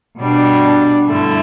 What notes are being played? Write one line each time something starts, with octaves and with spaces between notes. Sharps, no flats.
B2 G3 D4
G2 D3 A3 E4